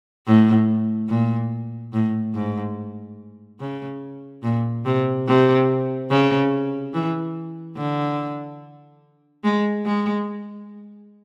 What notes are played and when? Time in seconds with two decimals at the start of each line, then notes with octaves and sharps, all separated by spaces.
0.27 A2
1.09 A#2
1.93 A2
2.34 G#2
3.60 C#3
4.43 A#2
4.85 C3
5.27 C3
6.10 C#3
6.94 E3
7.77 D3
9.44 G#3
9.85 G#3